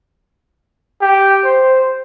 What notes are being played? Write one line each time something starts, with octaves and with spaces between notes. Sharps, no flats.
G4
C5